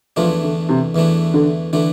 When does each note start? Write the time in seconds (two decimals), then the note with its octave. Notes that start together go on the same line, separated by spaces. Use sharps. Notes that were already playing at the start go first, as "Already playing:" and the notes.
0.16 E2 E3 F3 A3 D4
0.43 D3
0.69 C3
0.95 E2 E3 A3 D4
1.34 D3
1.73 D3 E3 A3 D4